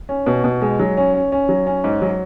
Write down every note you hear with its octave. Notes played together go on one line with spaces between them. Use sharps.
C#4
B2
B2
G#3
F#3
C#4
C#4
C#4
F#3
C#4
G#2
F#3